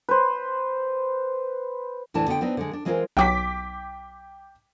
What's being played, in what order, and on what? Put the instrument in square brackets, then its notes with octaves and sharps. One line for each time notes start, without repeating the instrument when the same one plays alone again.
[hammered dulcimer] B4 C5
[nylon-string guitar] D2 A2 E3 D4 A5
D3 B3 D5 F5 G5
B3 C4 D4 D#4
D3 G#3
D4
E3 G#3 C4 F4 A#4
[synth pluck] B1 F#3 [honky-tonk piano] G5 D6 B6